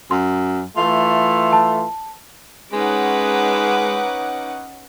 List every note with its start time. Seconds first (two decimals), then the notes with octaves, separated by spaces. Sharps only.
0.11 F#2 C6
0.77 E3 A3 F4
1.53 A5
2.73 G#3 C#4 D#4 B4 F#5 D6